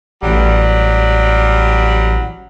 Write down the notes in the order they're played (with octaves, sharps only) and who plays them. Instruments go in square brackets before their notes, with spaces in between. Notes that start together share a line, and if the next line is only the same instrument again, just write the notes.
[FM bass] A1 [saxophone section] F#3 G3